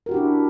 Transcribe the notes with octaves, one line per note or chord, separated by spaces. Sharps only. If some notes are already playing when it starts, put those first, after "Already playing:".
D4 E4 F#4 G4 A#4